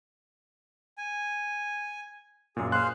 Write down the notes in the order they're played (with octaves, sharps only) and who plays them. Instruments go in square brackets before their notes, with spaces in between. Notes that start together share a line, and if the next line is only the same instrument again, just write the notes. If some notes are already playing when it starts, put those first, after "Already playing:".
[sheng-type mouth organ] G#5
[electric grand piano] F#2 A#2 [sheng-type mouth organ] G#4
[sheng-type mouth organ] G#4 C5 F5 [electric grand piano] C6 F#6